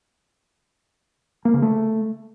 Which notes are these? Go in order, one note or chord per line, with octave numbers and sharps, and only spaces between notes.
A#3
C#3
A3